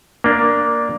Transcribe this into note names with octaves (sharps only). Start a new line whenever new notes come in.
A#3 D4